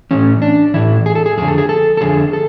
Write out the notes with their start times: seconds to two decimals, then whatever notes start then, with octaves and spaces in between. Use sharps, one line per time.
0.11 A2 E3 C#4
0.42 D4
0.74 A2 E3 E4
1.06 G#4
1.15 A4
1.26 G#4
1.37 F2 D3 G#4
1.48 A4
1.58 G#4
1.69 A4
1.97 A4
2.01 F2 D3 G#4
2.33 A4